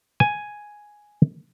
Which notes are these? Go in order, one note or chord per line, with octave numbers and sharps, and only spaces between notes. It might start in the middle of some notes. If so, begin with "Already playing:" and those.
G#5